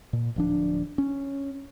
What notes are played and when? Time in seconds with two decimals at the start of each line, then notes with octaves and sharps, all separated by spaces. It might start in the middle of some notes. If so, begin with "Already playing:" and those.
0.13 A#2
0.36 D1 F3 D4
0.98 C#4